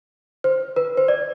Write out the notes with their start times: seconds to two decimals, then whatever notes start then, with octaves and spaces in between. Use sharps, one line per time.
0.44 C5
0.76 B4
0.97 C5
1.08 D5